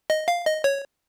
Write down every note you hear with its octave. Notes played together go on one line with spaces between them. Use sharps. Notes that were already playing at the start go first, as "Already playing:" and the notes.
D#5
F5
D#5
C#5